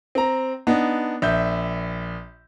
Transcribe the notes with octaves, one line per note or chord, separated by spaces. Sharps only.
C4 A#5
B3 D4 D#4
A#1 E5 G6